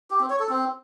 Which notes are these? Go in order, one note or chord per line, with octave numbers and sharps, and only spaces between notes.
G4
C4
C#5
A4
C4